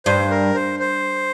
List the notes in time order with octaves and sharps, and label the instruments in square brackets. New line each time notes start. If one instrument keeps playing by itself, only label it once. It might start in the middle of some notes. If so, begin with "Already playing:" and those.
[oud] G2 [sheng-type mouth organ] C5
[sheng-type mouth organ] A#4
C5
C5